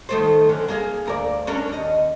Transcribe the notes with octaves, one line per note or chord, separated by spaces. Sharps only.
D#3 A3 C5
F#2 D3 C#4
A#3 G#4 F5
D2 A#4 D5
C#4 D4 A#4
D#2 D#5